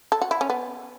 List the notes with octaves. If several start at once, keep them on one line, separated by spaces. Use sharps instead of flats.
A4
F#4
E4
C#4
B3